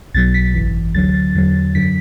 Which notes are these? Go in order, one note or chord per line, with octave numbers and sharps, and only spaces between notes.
B1 B2 F#3 A6
B6
G#1 F#2 E3
D2 D3 F#3 A6
E2 D3 F#3
F#2 D3 F#3 B6